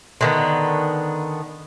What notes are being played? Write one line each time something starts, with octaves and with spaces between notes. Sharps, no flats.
D3 D#3 B3